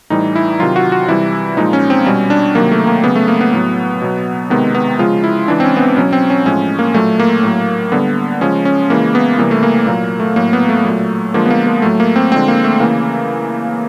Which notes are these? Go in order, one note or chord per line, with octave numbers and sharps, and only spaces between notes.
A2 E3 G3 D#4
E4
C3 D#3 F#3 F4
F#4
F#4
C3 E3 G3 E4
A#2 F3 G#3 D#4
C#4
C4
B2 G3 C#4
D4
C3 D#3 F#3 A#3
A3
A#3
C#3 F#3 B3
A3
A#3
B3
A2 F#3
B2 F#3
C3 D#3 G#3 B3
B3
C#3 F3 G#3 F4
E4
C#3 E3 G#3 D4
C4
C#4
B3
C4
B2 F#3 C#4
C4
C#4
A2 F3 G#3 C#4
A#3
A#2 F#3 A3
A#3
A2 F#3
D3 G3 B3
C#3 F3 G#3 C#4
C#4
C#3 E3 G#3 A#3
B3
C3 E3 G3 A#3
A3
A#3
A#2 F#3 A#3
A3
A2 F#3 A#3
B3
A3
A#2 F#3
D3 F3 G#3 A#3
B3
A#3
A#3
A2 F#3 A3
A#3
C4
D3 F3 G#3 C4
A#3
A3
C#3 E3 A#3